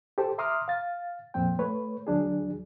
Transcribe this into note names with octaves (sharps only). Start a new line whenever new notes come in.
G4 A4 C5
E5 A#5 C6 D6 D#6 F6
F5 A6
F2 A#2 C4 C5 G5
A3 B4 C#5
D2 F#3 D4 G#4